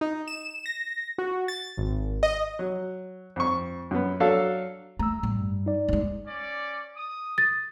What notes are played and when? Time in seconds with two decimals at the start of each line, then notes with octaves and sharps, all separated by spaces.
0.01 D#4
0.28 E7
0.66 A#6
1.18 F#4
1.48 A6
1.78 G#1
2.23 D#5
2.59 F#3
3.36 F2 C#6
3.91 F#2 B3
4.20 F#3 D4 A4 F5
4.99 A3 A#5 E6
5.23 A2 G3
5.39 G2
5.66 D#4 D5
5.89 G#2 G#3
6.26 C#4 D5
6.96 D#6
7.38 A6